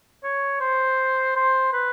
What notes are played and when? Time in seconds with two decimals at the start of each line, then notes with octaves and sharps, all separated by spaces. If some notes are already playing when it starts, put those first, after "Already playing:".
0.24 C#5
0.60 C5
1.36 C5
1.72 B4